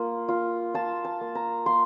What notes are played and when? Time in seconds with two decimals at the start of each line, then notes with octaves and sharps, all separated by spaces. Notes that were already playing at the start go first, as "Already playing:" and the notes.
Already playing: A#3 F4
0.28 F4
0.74 F4 A5
1.05 A5
1.21 A#3
1.35 A#5
1.66 A#3 C6